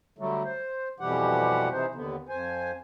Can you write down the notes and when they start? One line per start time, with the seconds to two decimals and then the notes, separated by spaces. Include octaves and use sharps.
0.18 D3 F#3 G3 A3
0.45 C5
1.00 F2 B2 E3 G3 G4 F#5
1.72 C3 E3 D#4 C5
1.95 D#2 D3 B3
2.29 F2 C5 G#5